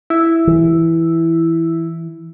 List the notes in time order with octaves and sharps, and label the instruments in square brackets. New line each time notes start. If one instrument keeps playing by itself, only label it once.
[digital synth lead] E4
[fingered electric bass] E3